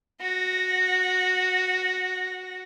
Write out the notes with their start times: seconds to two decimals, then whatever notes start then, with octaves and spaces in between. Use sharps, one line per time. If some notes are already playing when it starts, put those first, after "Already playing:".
0.21 F#4 A#6